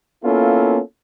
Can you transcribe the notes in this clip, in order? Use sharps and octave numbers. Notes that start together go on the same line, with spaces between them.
A#3 B3 C#4 E4 F4 A4